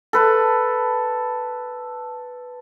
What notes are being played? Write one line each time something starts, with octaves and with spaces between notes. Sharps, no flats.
A4 B4 A5